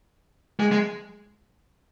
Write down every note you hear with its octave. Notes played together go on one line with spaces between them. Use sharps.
G#3
G#3